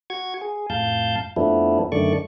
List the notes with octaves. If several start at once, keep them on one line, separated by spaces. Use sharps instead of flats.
F#4 C#6 G#6
G#4
F2 A2 F5 A5 G6
F2 F3 A3 B3 D4 E4
F#2 D3 D#3 A3 D5 C#6